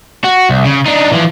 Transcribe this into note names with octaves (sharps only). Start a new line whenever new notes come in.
F#4
C2
C#3
D4 D#4
E3 F3